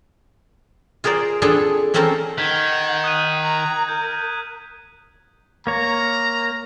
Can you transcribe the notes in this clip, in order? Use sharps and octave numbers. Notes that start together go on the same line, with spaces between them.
F4 G#4 A#4 C5 D5
B3 C4 D4 F4 G#4 A4
A#3 C4 C#4 A4 A#4 C5
D#3 F#5 G#6 B6
D#6 F#6 D#7
A#5
A#4 G6
A#3 C#5 A#5